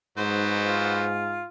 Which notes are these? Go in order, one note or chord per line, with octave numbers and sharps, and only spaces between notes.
G#2 F#3 B3 C5
F4